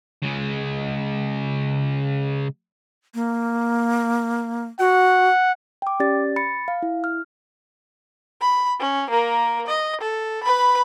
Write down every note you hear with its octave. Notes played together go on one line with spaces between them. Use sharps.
C#3 G#3
A#3
F#4 F#5
G5 D6
C#4 G4 D5 A6
B5 A6 C#7
F5
E4
F6
B5
C#4
A#3 A#4
D#5
A4
B4 B5